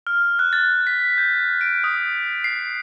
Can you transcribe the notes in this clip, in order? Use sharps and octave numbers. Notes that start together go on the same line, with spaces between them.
F6
F#6
A6
B6
G6
D7
D#6
C7